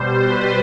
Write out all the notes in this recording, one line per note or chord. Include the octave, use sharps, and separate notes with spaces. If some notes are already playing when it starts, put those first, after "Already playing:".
Already playing: B2 G3 C5
B4